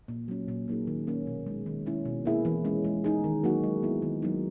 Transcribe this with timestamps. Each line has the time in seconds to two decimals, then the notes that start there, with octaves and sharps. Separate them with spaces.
0.08 A#2
0.28 F#3 C#4
0.48 A#2
0.68 F#3 A#3 D#4 G#4
0.87 D#3
1.07 A#3 C#4
1.27 B2
1.46 G#3 D#4
1.66 D#3
1.86 G#3 C#4 E4
2.05 B2
2.26 A#3 E4 G#4
2.45 E3
2.65 G#3 C#4
2.84 G#3
3.04 D#4 G#4
3.24 D#3
3.44 F#3 A#3 D#4 F#4
3.63 G#3
3.83 B3 E4
4.02 D#3
4.22 F#3 A#3 D#4